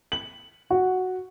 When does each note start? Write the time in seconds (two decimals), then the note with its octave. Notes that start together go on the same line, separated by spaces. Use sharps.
0.12 F#7
0.70 F#4